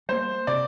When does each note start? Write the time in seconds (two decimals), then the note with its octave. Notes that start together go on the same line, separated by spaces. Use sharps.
0.09 G3 A#3 C5
0.47 C3 D5